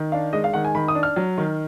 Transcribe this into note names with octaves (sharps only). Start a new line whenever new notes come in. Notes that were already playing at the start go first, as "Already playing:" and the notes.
Already playing: D#3
D4 F5
G#3 D#5
F5
D#3 F#5
G#5
D#3 B5
D#6
D4
F6
F#3
D#3